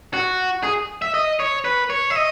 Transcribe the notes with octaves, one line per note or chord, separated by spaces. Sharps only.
F#4
G#4
E5
D#5
C#5
B4
C#5
E5
D#5